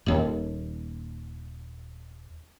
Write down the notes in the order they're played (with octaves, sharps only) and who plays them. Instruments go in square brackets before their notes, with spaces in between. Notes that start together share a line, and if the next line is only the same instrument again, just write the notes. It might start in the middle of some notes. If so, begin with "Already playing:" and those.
[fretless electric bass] D#1 D#2